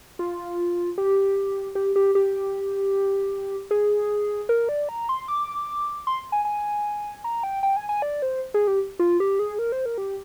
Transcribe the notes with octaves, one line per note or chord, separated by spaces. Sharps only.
F4
G4
G4
G4
G4
G#4
A#4
D5
A#5
C6
D6
C6
G#5
G#5
A#5
G5
G5
G#5
G#5
D5
C5
G#4
G4
F4
G4
G#4
A#4
C5
A#4
G4